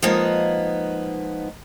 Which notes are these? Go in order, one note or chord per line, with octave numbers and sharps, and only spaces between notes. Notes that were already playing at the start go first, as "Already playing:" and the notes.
F3 G#3 A#3 B3 D#4